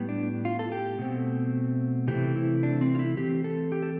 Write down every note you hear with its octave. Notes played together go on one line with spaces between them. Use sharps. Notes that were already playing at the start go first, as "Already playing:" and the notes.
Already playing: A2 G3 B3
D4
F4
A4
G4
B2 A3 C4
C3 E3 A3 C4 G4
E4
D4
C4
F4
E4
E3 A3 C4 G4
A4
G4
A4